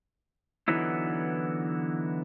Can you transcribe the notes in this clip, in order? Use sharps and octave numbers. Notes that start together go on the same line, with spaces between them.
D3 E3 F#3 B3 D#4 E4